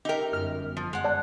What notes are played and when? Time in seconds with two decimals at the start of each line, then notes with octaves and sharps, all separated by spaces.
0.05 D#4 G4 A#4 E5 G5
0.32 G1 F#2 F6
0.77 F3
0.93 G#3 F#5
1.04 D5 A5 F#6